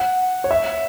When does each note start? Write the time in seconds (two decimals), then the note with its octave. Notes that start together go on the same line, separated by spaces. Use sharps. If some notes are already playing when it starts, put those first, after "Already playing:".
Already playing: F#5
0.44 C#5
0.51 E5